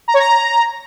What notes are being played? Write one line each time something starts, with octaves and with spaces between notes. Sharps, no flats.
A#5
C#5
A#5